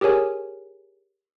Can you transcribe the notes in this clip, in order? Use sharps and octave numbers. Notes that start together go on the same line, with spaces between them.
G4 G#4 A#4 C#5 G#5